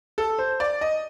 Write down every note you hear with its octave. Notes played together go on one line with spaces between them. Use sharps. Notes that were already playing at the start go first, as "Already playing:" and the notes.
A4
C5
D5
D#5